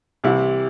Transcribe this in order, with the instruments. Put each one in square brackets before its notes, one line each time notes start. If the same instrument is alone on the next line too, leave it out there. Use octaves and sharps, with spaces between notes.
[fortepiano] C2 C3 E3 E4